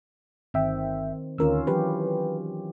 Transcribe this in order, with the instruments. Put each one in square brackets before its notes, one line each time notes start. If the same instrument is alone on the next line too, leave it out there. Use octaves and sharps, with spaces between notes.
[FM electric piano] G1 E5 G5 [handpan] D#3 C4
[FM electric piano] D2 A#4 E6 [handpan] D#3 C#4 F4
[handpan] E3 F#3 G4 [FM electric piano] B4